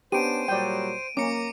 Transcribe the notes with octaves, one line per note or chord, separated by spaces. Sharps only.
B3 C#4 D4 G4 C5 D7 D#7
A#2 F#3 G3 D5 G5
A#3 C#4 A#5 D6 C#7